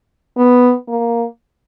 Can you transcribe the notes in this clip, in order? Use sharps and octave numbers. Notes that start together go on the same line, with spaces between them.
B3
A#3